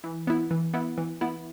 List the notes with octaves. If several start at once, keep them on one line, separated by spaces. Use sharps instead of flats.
E3
B3 E4
E3
B3 E4
E3
B3 E4